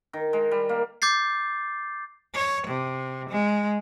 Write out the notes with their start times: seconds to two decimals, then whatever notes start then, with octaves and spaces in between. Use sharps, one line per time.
0.13 D#3
0.33 G#3
0.51 G3
0.69 A#3
1.02 D6 G6 A6 C7
2.34 C#5
2.67 C3
3.30 G#3